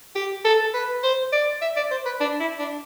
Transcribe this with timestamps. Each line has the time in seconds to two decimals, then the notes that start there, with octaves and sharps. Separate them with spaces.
0.15 G4
0.45 A4
0.74 B4
1.03 C5
1.33 D5
1.62 E5
1.76 D5
1.91 C5
2.06 B4
2.20 D4
2.40 E4
2.59 D4